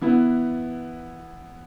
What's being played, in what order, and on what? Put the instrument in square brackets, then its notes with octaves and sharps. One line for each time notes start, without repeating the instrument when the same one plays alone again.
[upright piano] E3 B3 E4